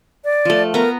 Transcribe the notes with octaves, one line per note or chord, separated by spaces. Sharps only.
D5
F3 A3
B3 A#4 A#5